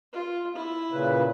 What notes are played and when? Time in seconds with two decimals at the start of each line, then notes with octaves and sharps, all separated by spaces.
0.12 F4
0.55 E4
0.92 A#2 C#3 B4